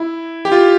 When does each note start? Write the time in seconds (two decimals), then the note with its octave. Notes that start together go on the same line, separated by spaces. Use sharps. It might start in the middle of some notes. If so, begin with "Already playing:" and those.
Already playing: E4
0.45 G4
0.52 F4